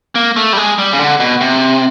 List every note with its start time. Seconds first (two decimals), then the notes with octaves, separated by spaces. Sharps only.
0.15 A#3
0.36 A3
0.53 G3
0.57 G#3
0.78 G3
0.93 C#3
0.99 D3
1.20 B2
1.41 C3